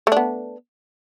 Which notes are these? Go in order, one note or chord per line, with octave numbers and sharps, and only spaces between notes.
A3 B3 D4